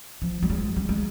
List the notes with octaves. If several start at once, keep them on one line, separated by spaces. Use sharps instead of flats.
F3
G3
G#3
G3
G#3